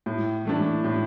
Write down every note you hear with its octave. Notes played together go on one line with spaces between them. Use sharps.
A2
E3 A3 D4
A2